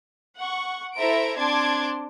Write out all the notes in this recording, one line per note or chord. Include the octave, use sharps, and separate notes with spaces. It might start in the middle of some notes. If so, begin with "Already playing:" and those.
F#5 C#6
E4 A4 C5 E5 A#5 D7
C4 D4 A5 C6 D6 G#6